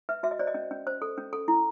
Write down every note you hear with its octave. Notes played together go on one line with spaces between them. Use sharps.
B4 E5
F#4 E5
D#5
C5 D5
D#5
C#4
C#4
C5
A4
C#4
A4
E4